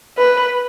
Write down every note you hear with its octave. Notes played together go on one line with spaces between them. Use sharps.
B4